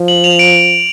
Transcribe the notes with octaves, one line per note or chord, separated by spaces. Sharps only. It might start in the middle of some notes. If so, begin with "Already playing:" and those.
Already playing: F3
F#7
F7
D7